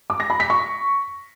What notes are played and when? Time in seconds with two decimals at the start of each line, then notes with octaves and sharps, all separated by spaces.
0.10 D6
0.20 A#6
0.30 B5
0.40 B6
0.50 C#6